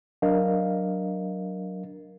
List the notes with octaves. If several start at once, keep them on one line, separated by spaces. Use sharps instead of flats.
F#3 D4 A#4 D#5 F5